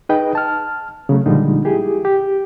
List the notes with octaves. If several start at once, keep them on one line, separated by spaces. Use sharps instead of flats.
D#4 G#4 B4 D#5 G5
A5 F6
C#3 F#3 A3
A#2 D3 F3 G3 G#3 D#4
E4 G4 G#4
G4